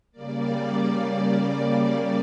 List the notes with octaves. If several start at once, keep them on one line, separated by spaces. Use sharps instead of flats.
C#3 G3 A#3 D5